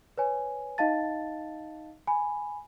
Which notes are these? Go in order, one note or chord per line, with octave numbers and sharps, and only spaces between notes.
B4 C#5 G#5
D#4 D#5 F5 A5 A6
G#5 B5